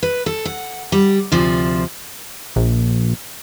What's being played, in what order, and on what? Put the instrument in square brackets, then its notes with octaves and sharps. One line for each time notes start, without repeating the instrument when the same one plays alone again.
[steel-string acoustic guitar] B4
A4
F#5
G3
D2 C3 F3 D5
[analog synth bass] A#1